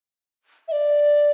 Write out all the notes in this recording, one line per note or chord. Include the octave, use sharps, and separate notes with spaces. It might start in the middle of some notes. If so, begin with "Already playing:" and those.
E5
D5